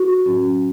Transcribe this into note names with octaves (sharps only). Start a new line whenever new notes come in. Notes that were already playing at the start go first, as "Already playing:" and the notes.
Already playing: F#4
A2 F#3 C#4